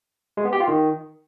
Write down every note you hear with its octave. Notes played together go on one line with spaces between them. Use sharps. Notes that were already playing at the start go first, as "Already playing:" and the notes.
G#3
B3
G4
F4
D#3